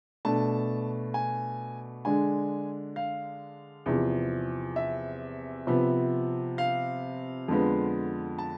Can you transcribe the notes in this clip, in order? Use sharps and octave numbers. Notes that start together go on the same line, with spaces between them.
B2 A3 D4 A5
G#5
D3 G#3 D4 G#5
F5
E2 C3 F3
E5
C3 F3 B3
F5
F2 D3 G#3 B3
A5